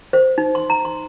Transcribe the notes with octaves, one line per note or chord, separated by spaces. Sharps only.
C5
D#4
C6
A#5
C6